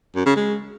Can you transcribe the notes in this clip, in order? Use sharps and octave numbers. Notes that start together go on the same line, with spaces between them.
F#2
C#3
G#3